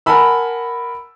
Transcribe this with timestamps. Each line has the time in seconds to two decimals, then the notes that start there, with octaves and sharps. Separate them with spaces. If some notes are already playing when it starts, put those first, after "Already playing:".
0.06 A#4 F#5 G#5 A5 B5 E6